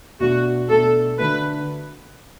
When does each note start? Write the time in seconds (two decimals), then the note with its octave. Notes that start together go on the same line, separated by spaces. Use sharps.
0.20 B2 A3 D4 F#4
0.69 B2 A3 D4 A4
1.18 D3 A3 F#4 B4